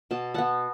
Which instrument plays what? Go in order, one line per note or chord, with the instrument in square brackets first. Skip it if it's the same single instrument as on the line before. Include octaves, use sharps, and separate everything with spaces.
[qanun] B2 A5
B3 F#5 A5